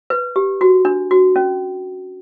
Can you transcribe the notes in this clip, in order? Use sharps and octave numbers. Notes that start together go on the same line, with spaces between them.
B4
G4
F#4
D4
F#4
C#4